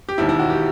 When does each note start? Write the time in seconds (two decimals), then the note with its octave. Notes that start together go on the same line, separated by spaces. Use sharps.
0.09 G4
0.18 E1 D#2 D#3 E4
0.29 E4
0.39 F#4
0.50 G4